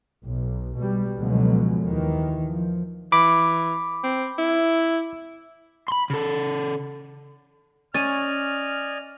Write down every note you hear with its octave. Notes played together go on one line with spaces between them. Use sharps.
B1
B2 G3
C#2 B2 D3 F3 F#3 G#3
D#2 D#3 E3
F3
E3 B5 D6
C4
E4
B5 C6
C#3 A4
C#4 D5 D#5 G#5 F6 A6 D#7